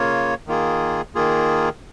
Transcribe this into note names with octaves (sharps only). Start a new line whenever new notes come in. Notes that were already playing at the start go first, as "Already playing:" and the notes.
Already playing: C#3 A#3 F4 C#5
D#3 A#3 F4 G#4
D#3 A#3 F4 G#4